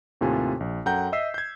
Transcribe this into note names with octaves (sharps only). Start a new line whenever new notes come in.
D#2 A2 C3 F4 G#5
A#1
F#2 A4 F#5 G5 A#5 G6
D#5 E5 E6 B6 C7
G6 G#6